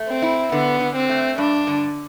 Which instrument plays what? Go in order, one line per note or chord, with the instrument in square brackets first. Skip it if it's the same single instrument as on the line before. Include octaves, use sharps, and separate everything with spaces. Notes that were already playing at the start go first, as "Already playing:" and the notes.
Already playing: [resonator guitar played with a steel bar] A3
[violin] C4
[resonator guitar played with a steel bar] E4
[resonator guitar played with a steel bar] D3 [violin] B3
[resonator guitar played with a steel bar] D3
[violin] C4
[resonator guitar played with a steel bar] A3
[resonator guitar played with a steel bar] G2 [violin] D4
[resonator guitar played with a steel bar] D3